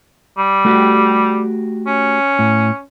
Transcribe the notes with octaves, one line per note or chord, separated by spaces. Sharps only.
G3
A3 F#4 G4
C#4
A2